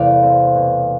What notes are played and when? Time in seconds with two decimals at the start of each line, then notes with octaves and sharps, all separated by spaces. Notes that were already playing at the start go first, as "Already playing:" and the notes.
Already playing: E2 C3 A3 D5 F5
0.22 C4
0.55 B2